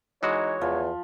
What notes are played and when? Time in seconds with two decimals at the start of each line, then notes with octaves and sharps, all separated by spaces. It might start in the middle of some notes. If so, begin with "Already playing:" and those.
0.23 E3 G#3 D#4 F#4 C#5
0.61 E2 F3